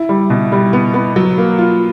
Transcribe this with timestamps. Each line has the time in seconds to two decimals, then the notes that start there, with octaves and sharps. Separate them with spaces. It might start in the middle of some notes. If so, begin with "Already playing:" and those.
Already playing: E4
0.09 G3
0.30 B2
0.52 G3
0.73 B3
0.94 B3
1.16 F#3
1.38 A#3
1.58 F4